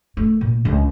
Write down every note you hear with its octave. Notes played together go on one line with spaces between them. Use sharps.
A3
A#2
C#2